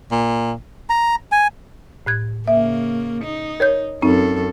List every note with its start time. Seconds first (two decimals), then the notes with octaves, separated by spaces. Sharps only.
0.11 A#2
0.90 A#5
1.32 G#5
2.06 A2 F#6 G#6
2.48 C#3 A#3 E5
3.24 D#4
3.60 A#4 C#5 G6
4.02 F#2 C4 D#4 A4